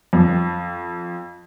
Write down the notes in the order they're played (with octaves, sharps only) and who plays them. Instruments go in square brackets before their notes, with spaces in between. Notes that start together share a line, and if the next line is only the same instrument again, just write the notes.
[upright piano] F2